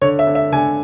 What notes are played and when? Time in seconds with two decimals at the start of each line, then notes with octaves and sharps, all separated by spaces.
0.02 D3 C#5
0.19 E5
0.27 D3
0.35 E5
0.52 D3 G#5